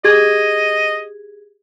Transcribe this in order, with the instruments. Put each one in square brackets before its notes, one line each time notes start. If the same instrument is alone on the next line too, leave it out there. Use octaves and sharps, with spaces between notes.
[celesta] G4 G#4 G#6 [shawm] D#5